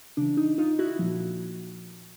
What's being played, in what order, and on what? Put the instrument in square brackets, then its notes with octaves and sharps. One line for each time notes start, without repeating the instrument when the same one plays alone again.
[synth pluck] C#3 E3 D4
D#4
D#4 F4
E4 F#4
A#2 F3